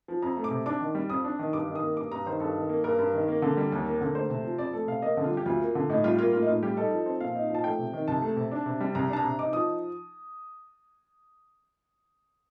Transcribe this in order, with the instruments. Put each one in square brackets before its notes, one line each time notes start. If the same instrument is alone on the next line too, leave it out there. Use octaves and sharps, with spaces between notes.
[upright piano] F3
F2 A#5
A3
D6
C3
D4 D6
D#3
G3
F2 D#6
D4
D#3
G2 D6
D#3
D#6
A#3
G2 D6
G2 A#5
D#3 C5
G2 A4
D#3
A#3
G2 A#4
G2
D#3
A#3
D3
G3
D#2
A#3
D3
A3 C5
C3
F3
F2 D5
A3 A4
C3 F5
A#3 D#5
D3
F4
G3
G4
D2 F4
A#3
D3
A2 D#4
G3 F4
A#3 F4
A2 F4
D#4
A2 F4
G3 G4
D#4 A4
F3
C4
A#2 F5
D#4
F3 A5
A3 G5
C3
D#3
C2 A5
A3
C3
D4
C3
G3
C2 A#5
D4 A5
A#5
C3
D#4 D6
F3 D#6